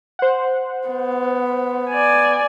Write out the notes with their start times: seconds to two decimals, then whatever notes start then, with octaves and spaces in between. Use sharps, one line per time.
0.19 C5 F#5
0.87 B3
1.90 D5 G#5